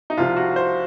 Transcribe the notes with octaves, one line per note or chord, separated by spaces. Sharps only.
D#4
C2 C3 F3 F4
F#4
C5